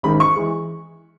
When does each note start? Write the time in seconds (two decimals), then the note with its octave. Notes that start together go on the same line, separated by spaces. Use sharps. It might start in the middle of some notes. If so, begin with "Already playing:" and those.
0.03 G#1 G#2 D#3 B5
0.20 C#6
0.36 E3 G#3